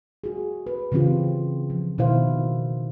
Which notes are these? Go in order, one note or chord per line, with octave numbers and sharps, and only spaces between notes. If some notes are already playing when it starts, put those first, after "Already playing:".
F#4 G#4
B4
C#3 E3 C4 F4 G4
F3
B2 D#3 E4 C5 F5